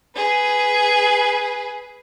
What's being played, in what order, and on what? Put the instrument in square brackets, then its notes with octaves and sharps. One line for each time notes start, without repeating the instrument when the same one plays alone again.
[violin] G#4 B4